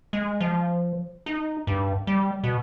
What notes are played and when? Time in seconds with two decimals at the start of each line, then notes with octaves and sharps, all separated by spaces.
0.13 G#3
0.40 F3
1.26 D#4
1.67 G2
2.07 G3
2.43 B2